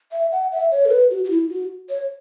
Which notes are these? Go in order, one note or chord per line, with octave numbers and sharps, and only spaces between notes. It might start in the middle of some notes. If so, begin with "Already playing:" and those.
E5
F#5
E5
C#5
A4
B4
F#4
F#4
E4
F#4
C#5